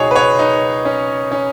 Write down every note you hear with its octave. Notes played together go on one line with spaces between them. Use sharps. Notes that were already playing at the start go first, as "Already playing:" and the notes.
Already playing: C#2 B2 D#4 G#4 C#5
B4
C#5
D#4
C#4
C#4